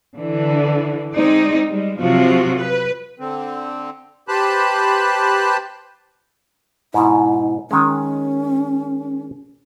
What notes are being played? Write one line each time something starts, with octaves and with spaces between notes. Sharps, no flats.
D3 E3
G#3 C4 D#4 D5
G3 G#3
C3 F3 F#3 C4 F4 F#4
B4
D3 C4
G4 B4 C5 A5 B5 F#6
G#2 B2 E4
D#3 G#3 C#4